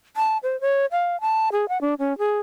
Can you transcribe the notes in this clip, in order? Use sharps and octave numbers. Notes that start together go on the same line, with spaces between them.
A5
C5
C#5
F5
A5
G#4
F#5
D4
C#4
G#4